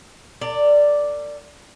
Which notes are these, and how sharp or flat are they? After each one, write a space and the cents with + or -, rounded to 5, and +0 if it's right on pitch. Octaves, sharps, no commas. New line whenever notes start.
A#4 -45 D5 +0